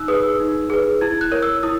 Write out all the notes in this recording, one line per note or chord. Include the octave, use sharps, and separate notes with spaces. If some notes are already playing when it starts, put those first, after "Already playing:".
Already playing: D#4 E6 F#6
G#4 B4 D#6
E6
D#4
G#4 B4
E4 G#6
F#6
A#4 C#5
E6
E4 D#6